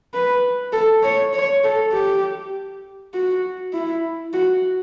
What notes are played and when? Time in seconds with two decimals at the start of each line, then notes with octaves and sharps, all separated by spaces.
0.14 B4
0.73 A4
1.03 C#5
1.33 C#5
1.64 A4
1.93 G4
3.14 F#4
3.73 E4
4.34 F#4